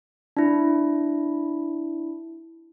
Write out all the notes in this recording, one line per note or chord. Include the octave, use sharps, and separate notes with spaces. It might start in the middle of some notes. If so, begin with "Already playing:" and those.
D4 E4